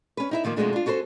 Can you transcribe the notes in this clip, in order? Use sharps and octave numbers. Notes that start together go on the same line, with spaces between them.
C#4 B4
D#4 E4 E5
A#2 D#3 F3 A#3
F2 B2 D3 G#3 A3 D4
D4 F4
C#4 F#4 A4 B4 C5